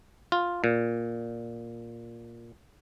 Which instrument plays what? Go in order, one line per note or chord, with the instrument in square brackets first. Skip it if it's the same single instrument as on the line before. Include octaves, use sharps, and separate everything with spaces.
[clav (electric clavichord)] F4
A#2